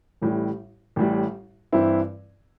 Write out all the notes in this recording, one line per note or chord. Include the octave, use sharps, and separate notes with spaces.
A1 A2 G3
A1 A2 G3
G2 E3 C4 E4